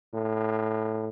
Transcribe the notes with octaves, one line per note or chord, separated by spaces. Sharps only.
A2